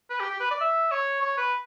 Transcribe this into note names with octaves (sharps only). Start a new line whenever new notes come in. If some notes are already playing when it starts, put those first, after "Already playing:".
B4
G4
G4
B4
D5
E5
C#5
C#5
B4